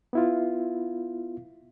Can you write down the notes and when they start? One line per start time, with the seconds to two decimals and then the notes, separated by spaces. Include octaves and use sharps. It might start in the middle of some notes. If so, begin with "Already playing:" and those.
0.13 B3 E4 F4